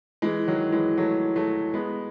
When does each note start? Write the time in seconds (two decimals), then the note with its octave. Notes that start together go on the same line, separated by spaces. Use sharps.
0.22 E3 G#3
0.48 D#3 F#3
0.72 E3 G#3
0.98 F#3 A3
1.36 F#3 A3
1.74 G#3 B3